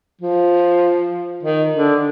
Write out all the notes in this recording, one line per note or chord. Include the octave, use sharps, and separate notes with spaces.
F3
D#3
D3